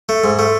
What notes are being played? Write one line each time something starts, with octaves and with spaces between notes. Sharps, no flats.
A3
G#2
A3